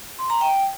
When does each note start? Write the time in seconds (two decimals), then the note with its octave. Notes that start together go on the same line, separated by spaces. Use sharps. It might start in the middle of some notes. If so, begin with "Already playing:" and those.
0.19 C6
0.30 A#5
0.41 G5